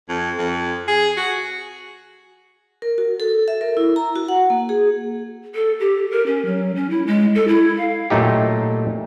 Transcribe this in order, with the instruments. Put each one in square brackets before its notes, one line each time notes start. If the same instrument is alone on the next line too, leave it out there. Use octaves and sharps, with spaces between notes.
[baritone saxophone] F2
F2
G#4
F#4
[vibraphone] A#4
F#4
A4
E5
A#4
E4
A#5
F#4
F#5
A#3
G#4
[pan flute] A4
G4
A#4
C#4
F#3
C#4
E4
G#3
A4
E4
F5
[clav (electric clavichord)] A#2 F#3 A3 D#4 G4